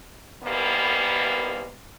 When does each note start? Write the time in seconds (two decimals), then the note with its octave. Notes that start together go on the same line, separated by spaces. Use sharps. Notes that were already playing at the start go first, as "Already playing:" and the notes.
0.44 D#2 G#2 E3 G3 A#3 B3